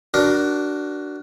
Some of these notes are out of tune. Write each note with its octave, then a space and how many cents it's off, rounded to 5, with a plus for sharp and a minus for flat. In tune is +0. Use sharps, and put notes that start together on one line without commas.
D4 +0 F#4 +15 A#4 +15